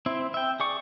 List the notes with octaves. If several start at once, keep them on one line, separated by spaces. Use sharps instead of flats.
C4 E4
E5 G5
G#4 D5 C#6